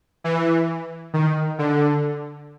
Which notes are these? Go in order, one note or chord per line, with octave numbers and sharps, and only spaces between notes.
E3
D#3
D3